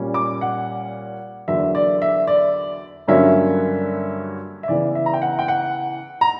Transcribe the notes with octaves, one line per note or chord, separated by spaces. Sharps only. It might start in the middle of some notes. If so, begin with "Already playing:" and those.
Already playing: A#2 G3 C#4
D6
F#5
E2 D3 F#3 A#3 E5
D5
E5
D5
G2 D3 F#3 A#3 C#4 E5
E5
C#3 E3 B3 D5
E5
A#5
G5
F#5
G5
F#5
A#5